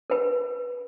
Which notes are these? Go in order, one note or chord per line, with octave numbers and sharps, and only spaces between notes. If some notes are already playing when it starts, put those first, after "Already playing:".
A#4 B4